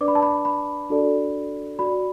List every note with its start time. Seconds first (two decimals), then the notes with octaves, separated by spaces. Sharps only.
0.01 D4 B4 D5 D6
0.08 B5
0.15 A5
0.22 B5
0.45 B5
0.90 D4 F#4 A4 D5
1.79 F#4 D5 B5